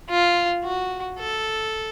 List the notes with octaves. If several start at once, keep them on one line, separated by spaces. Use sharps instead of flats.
F4
F#4
A4